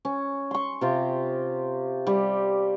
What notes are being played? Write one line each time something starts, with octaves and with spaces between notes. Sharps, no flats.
C#4
C6 C#6
C3 F4 G4
G3 G4